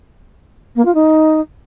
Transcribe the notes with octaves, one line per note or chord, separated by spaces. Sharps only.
A#3
F4
D#4